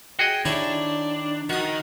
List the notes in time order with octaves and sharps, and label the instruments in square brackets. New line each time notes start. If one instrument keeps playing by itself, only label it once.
[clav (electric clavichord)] F#4 G#4 D#5 [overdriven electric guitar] G5
[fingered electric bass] D#3 [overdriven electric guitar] D4 [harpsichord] E4 G4 C#5
[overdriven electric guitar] D#3 [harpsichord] F#4 D#6